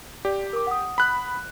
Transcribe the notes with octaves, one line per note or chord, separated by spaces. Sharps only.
G4 D5
A#4 D6
F#5 D#6
B5 F#6